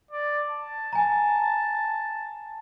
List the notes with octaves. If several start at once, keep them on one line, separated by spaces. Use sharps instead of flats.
D5
A5
G#5 A#5